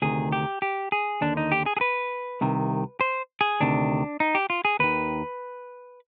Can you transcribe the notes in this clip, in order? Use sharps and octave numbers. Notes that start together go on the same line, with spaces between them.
D2 C3 D#3 G#4
G4
G4
G#4
D#2 D3 D4
D#4
G4
G#4
G#4
B4
C2 C3 D#3
C5
G#4
D2 C3 D#3 D4
D#4
G4
F4
G#4
D#2 D#3 B4